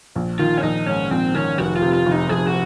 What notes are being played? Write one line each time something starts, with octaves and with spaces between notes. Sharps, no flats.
A#1
D#3 F4
C#4
A#1 D#4
G#2 C#4
A#1 C4
D#3 C#4
F1 F#4
F4
C3
F4
F1
D#4
F2 G#4
F#4